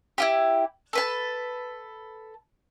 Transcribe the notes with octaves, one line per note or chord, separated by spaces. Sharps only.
E4 F4 G4
A4 B4 A5